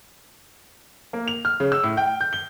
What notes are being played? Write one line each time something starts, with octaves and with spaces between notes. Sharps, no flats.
A#3
F7
F6
C#3
E6
A2
G5
G6
G7